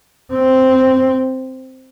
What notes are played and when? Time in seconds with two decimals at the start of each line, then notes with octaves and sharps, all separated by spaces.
0.33 C4